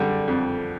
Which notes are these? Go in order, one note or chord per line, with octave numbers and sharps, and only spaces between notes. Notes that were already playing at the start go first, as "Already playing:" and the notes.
Already playing: D3 G3
F2